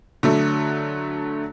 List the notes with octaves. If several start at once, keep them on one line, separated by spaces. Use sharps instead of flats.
D3 F#3 A3